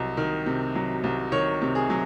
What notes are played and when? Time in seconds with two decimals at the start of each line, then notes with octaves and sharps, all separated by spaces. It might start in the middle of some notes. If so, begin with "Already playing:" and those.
Already playing: C2 F#3 D#5
0.17 D#3
0.46 C3
0.75 F#3
1.04 C2
1.32 D#3 C#5
1.62 C3
1.75 G#4
1.90 F#3